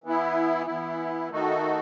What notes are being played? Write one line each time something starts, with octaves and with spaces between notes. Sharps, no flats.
E3 B3 E4
E3 B3 E4
D#3 A3 D#4 F#4 A4